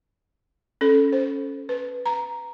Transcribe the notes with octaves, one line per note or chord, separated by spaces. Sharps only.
C#4 A4
C5
B4
A#5